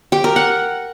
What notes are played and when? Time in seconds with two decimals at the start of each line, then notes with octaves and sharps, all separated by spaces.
0.12 G4
0.24 A#4
0.36 F#5